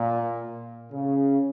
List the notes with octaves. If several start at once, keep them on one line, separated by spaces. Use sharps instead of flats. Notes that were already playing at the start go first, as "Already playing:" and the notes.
Already playing: A#2
C#3